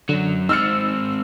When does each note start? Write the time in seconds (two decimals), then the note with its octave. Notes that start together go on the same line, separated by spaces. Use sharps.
0.09 F#2 D3 F#3
0.49 G#2 C4 D#4 E6 F6 A6 C#7